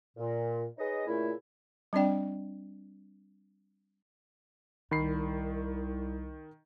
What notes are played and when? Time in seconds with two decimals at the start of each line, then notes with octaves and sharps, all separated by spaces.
0.17 A#2
0.78 D#4 G#4 B4 C#5 D#5
1.07 A#2 C#3 A3 E4
1.93 G3 C4 D4 D5 G5
4.91 C2 D#3 B5 C7